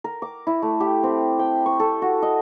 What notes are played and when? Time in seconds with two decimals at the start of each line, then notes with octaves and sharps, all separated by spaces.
0.04 A#4
0.22 D6
0.47 E4
0.62 A3
0.80 G4
1.03 C4
1.39 G5
1.66 C#6
1.80 A4
2.02 F#4
2.22 D#5